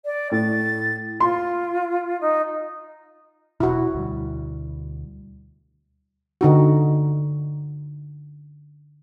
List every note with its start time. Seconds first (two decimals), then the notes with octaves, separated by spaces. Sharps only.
0.05 D5
0.31 A2 A6
1.20 F4 C6
2.20 D#4
3.60 E1 B2 E4 F#4
3.95 D2 B2 G3
6.41 D3 D#4 F#4